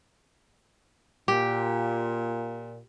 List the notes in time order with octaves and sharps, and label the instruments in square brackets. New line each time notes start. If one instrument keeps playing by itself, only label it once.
[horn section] A#2 [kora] G4